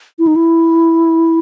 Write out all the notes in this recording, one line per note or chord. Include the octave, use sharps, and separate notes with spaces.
E4
D#4
E4